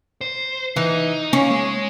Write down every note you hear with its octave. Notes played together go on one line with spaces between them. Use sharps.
C5
E3 D#4
A#3 C#4
G#3